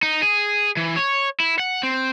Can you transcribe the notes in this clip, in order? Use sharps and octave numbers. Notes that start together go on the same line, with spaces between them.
D#4
G#4
E3
C#5
E4
F#5
C4